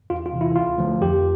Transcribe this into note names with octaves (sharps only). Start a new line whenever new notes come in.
E2 F4
F4
C3 E3
E4
D2 F4
D3 F3 A3
F2 G4